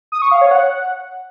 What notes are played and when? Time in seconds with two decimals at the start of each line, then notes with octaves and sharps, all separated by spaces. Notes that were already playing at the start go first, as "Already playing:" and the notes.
0.12 D#6
0.22 C#6
0.32 F5
0.41 C#5
0.51 F#5